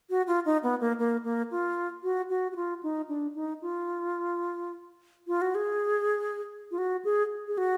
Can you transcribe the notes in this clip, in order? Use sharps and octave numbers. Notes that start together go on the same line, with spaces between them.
F#4
F4
D#4
B3
A#3
A#3
A#3
F4
F#4
F#4
F#4
F4
D#4
D4
D#4
F4
F4
F#4
G#4
F4
F#4
G#4
G#4
F#4